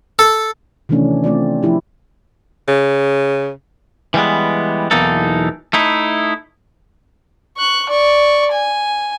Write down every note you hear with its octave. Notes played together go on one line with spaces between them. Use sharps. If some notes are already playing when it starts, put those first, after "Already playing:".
A4
C3 D#3 E3 A3 C#4 D4
A3 C4 F4 D5
F3 E4 G4
C#3
E3 G3 G#3 B3
B1 E2 E3 A#3 D#4 A4
A3 D#4 E4
C#6 F#6
D5 C#6
G#5